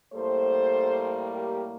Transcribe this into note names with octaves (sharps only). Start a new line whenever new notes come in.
A2 G3 A#3 A4 C5
G4 A#4